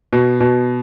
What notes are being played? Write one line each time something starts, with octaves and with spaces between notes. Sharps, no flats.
B2
B2